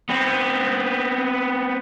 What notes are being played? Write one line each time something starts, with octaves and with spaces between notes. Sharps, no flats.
B3 C4